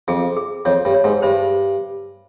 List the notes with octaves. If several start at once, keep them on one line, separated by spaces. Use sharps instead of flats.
F2 G#4
G#4
F2 C#5
G2
C#5
G#2
G2 C5